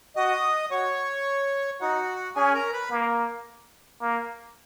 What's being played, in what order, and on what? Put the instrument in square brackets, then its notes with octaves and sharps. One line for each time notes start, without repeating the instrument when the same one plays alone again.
[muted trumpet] F#4 [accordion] D#5 D#6
[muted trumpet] F#4 [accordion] C#5 C#6
[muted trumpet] D#4 [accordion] F#4 F#5
[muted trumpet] C#4 [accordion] G#4 G#5
[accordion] A#4 A#5
B4 B5
[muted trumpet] A#3
A#3